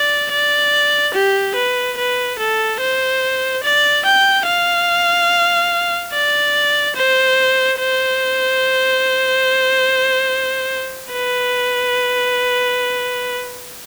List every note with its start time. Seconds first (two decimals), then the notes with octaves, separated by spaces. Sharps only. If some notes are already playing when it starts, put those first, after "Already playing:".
Already playing: D5
0.31 D5
1.14 G4
1.56 B4
1.98 B4
2.39 A4
2.80 C5
3.64 D5
4.05 G5
4.47 F5
6.13 D5
6.96 C5
7.79 C5
11.12 B4